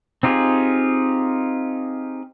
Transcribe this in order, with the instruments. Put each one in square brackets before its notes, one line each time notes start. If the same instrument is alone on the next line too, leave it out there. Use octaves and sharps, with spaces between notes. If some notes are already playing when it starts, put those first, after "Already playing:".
[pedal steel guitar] C4 D#4 F4 G4 G#4